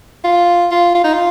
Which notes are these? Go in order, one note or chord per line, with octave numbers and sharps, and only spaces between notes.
F4
F4
F4
D#4
F4